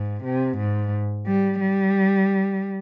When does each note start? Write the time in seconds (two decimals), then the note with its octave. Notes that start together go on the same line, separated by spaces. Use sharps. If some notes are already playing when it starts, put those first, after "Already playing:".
Already playing: G#2
0.24 C3
0.58 G#2
1.27 G3
1.60 G3